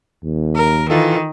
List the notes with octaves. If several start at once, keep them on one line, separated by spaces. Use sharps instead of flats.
D#2
A#4
D#3 E3 F4 A4